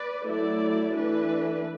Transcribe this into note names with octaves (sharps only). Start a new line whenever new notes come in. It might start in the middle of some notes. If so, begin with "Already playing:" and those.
Already playing: B4 D5
F#3 A3 E4 D5
E3 A3 D4 B4